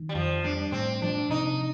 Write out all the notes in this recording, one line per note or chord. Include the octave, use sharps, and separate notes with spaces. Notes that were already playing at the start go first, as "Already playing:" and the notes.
Already playing: D#3
G3
F2 F3
G3 D4
A2 C4
F3 D4
C3 D#4